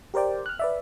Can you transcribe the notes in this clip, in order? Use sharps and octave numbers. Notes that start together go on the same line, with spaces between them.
G4 A#4 C5 D5 G5
F6 F#6
B4 D5 E5